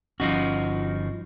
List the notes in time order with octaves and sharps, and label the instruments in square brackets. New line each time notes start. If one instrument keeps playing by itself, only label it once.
[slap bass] G1 C#4 [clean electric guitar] F3 D#4 F#4